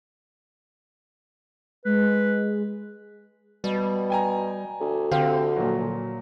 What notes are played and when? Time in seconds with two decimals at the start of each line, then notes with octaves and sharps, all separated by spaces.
1.85 G#3 B4
3.64 B2 G3
4.10 G5 G#5 A#5
4.81 D2
5.11 D3 C4 G4 F5
5.56 A#2 F3 F#3